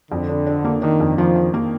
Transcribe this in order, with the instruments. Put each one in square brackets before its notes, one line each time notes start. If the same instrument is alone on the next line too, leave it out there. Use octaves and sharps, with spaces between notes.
[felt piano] F2 [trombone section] D3
[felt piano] D4
D4
A#3
[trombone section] D#3 [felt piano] D4
[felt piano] F2
[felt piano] D#3 [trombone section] F3
[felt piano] D#3
A#3